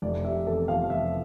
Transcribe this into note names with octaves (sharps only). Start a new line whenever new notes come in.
F1 D5
C3 E5
E2 A4
F3 F5
F1 E5